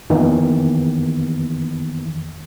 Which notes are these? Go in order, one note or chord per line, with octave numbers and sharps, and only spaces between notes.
F2 D#3 E3 A#3 B3